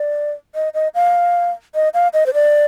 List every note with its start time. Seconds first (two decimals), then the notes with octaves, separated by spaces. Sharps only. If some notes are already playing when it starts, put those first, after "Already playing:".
Already playing: D5
0.55 D#5
0.74 D#5
0.95 F5
1.75 D#5
1.94 F5
2.14 D#5
2.26 C5
2.34 D5